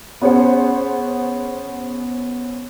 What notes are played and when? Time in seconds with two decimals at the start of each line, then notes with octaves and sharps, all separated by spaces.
0.22 B3 C#4 G#4 C5 F#5